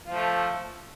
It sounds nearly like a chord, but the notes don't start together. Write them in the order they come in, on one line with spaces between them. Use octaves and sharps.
F4 F3 A3